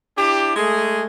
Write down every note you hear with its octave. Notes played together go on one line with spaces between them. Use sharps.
D4 E4 G4
G#3 A3 G#4